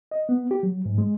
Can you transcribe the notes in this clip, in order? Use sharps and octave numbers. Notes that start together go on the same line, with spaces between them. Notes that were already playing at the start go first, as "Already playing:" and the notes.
D#5
B3
G4
F#3
G#2
G#3